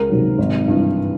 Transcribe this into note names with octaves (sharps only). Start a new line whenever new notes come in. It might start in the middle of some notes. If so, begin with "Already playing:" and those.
Already playing: C#2 A#4
C3 D#3 F#3
G#1
G2 E3